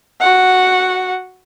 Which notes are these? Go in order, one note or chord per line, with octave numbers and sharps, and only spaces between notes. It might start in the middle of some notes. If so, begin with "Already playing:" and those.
F#4 F#5